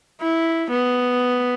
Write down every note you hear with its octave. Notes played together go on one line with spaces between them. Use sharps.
E4
B3